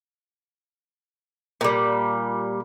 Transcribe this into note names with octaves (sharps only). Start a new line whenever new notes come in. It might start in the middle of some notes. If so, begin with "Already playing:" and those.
A#2 G3